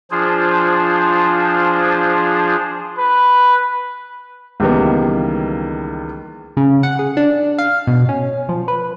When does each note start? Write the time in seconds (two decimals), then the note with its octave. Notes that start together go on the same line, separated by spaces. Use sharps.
0.11 F3 D4 F4 G#4 C5
2.98 B4
4.60 C#2 D#3 E3 G3 A#3 B3
6.57 C#3
6.83 F#5
6.99 G#4
7.17 D4
7.59 F5
7.87 B2
8.09 C#4
8.49 F3
8.68 B4